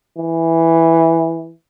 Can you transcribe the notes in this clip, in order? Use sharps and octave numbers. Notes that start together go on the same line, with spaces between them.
E3